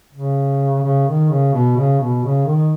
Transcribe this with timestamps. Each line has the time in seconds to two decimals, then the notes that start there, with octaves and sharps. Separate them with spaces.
0.12 C#3
0.82 C#3
1.07 D#3
1.29 C#3
1.53 B2
1.76 C#3
2.00 B2
2.23 C#3
2.45 D#3